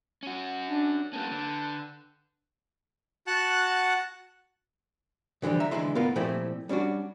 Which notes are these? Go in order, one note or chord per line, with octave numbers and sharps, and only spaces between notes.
C#4 F#4
D4
F#3 A#3 C#4 B4 G5 A5
D3
F#4 F#5 A5 F#6
B2 D3 E3 F3 G3
E5 A#5
B1 D3 E3 G#3 E4 C6
B3 F4 A#4 B4
A#2 F3 A3 C4 E4 G4
G3 C#4 D4 F#4